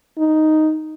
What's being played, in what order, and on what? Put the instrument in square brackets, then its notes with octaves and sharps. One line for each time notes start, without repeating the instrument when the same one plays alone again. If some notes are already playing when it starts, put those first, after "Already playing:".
[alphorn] D#4